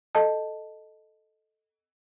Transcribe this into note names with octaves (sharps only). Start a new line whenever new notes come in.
A4 D#5 A5